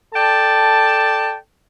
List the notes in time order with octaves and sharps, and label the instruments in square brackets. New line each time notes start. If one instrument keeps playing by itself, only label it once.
[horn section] A4 D5 G5 A5